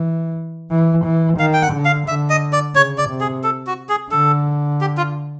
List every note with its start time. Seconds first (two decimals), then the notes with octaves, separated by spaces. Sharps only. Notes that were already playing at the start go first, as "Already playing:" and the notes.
Already playing: E3
0.71 E3
1.06 E3
1.39 D#3 F5
1.53 G5
1.62 F#5
1.73 D3
1.85 F5
2.08 D3 E5
2.30 D#5
2.53 D5
2.75 C#3 C#5
2.98 D5
3.09 C3
3.21 G#4
3.44 A4
3.67 F#4
3.89 G#4
4.11 D3 A4
4.81 G4
4.97 F4